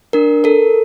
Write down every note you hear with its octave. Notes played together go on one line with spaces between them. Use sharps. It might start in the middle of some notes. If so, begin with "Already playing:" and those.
D4 A#4
A4 A#4